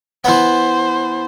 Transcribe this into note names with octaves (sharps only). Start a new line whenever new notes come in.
E3 B3 C5